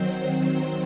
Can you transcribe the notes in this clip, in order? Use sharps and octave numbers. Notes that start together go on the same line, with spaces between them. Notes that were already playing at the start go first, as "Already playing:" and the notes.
Already playing: D#3 F#3 C4 C5